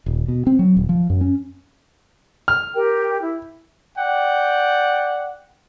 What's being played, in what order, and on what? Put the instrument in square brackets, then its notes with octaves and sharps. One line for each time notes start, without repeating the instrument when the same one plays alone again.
[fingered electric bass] D#1
B2
C4
F#3
D#1
F3
F#2
C#4
[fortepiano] F6
[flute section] G4 A#4 G5
E4
[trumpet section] D5 F#5 G5